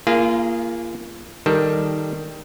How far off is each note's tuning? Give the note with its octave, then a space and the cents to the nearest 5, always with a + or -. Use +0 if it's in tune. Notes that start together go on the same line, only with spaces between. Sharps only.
A#3 +0 F4 -35 G#4 +0
D#3 +0 G3 +0 A4 +0